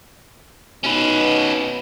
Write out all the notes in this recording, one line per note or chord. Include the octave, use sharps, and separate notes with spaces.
B2 C#4 D#4 B4